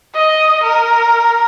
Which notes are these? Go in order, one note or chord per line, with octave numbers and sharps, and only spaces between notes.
D#5
A#4